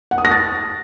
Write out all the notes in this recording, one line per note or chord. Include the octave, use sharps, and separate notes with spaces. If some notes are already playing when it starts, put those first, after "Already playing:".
F#5
D#6
A#6
A6